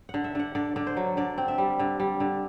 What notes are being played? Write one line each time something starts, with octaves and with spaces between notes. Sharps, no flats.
D3 F#5
E5
D3 F#5
D3 D5
D3 D5
C5
F#3
D3 D5
C4
E5
G3
D3
G3
D3